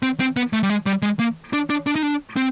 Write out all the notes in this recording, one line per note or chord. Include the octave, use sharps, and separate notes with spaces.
C4
C4
B3
A3
G3
G#3
G3
G#3
A#3
D4
D4
D4
D#4
D4
C4